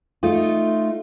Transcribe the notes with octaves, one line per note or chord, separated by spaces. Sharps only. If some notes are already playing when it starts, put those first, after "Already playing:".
A3 D#4 F4